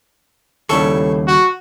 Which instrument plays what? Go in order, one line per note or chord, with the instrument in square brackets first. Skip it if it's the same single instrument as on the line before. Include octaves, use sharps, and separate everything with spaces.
[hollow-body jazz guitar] D#2 C#3 G3 [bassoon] A2 [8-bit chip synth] A4 C#6
[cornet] F#4